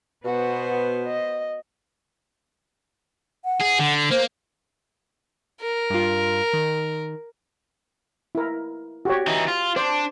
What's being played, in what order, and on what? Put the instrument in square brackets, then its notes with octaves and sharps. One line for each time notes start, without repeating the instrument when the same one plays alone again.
[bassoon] B2 [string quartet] B3 C5 [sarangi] F#4
[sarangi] D#5
[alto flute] F#5
[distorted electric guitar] G#4
D3
[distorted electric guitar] A#3 [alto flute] C5
[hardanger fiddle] A#4
[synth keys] G2 F4
D#3
[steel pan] E4 A#4
F#4 G4 C#5
[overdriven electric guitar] E3 D#4
F4
[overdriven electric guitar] D4 [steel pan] C5